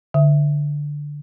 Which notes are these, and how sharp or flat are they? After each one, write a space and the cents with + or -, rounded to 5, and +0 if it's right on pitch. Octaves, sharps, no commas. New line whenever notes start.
D3 +0 E5 +0